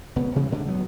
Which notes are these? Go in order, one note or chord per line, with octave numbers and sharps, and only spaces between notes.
D#1 C#2 B2 B3
C3 E3 G3 G#3
G#2 D3 A3 D4
D2 F#3 B3